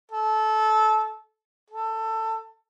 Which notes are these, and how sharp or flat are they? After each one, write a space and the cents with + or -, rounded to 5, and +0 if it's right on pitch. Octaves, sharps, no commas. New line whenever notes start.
A4 -20
A4 +15